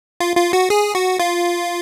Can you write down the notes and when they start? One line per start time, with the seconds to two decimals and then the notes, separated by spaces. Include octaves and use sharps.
0.20 F4
0.37 F4
0.53 F#4
0.70 G#4
0.95 F#4
1.20 F4